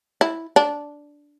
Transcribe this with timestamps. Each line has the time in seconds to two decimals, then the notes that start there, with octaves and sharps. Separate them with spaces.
0.21 E4
0.56 D4